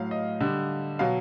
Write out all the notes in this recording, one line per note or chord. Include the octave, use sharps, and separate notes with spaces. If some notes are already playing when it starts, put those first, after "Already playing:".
Already playing: A2 F#3 F5
D#5
D3 G3
B2 F#3 F5